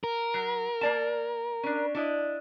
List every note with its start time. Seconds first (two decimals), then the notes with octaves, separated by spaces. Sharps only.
0.04 A#4
0.34 F#3
0.81 A#3 D5 A5
1.63 C#4 D4
1.95 D4 E4 D#5